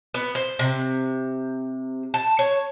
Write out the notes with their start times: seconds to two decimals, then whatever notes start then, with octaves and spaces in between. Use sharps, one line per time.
0.14 B3
0.35 C5
0.59 C3
2.14 A5
2.39 C#5